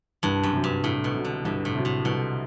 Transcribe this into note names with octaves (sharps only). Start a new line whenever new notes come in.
C2 G2
F#2
C3 F#3
G2
C2 A2
B2
C3 F#3
D3
C2 G2
A2
C3 F#3
A2
C2 B2